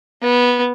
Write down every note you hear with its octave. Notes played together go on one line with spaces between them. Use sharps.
B3